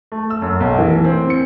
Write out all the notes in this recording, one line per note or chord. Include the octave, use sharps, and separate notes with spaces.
A3
E6
F#2
B1
E3
C4
C#7